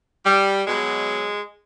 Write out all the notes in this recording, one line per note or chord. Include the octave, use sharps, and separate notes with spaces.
G3
B2 F#3 G#3